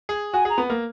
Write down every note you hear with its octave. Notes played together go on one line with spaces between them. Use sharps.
G#4
F#4 G#5
G#4 A#5
B3
A#3